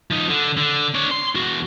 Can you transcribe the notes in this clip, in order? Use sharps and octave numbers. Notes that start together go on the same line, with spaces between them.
F3 D#4
D3
D3
D4 C#5
C6
E2 F#4